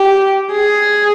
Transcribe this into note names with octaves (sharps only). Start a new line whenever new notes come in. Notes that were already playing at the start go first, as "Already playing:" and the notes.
Already playing: G4
G#4